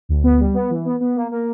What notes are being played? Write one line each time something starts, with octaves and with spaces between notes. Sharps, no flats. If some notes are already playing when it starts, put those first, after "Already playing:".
D2
B3
G3
B3
E3
B3
B3
A#3
A#3